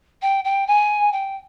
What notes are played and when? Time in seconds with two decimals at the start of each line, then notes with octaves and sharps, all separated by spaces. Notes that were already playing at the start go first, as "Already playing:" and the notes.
0.22 G5
0.44 G5
0.67 G#5
1.12 G5